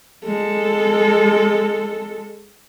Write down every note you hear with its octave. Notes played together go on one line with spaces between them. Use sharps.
G#3 A4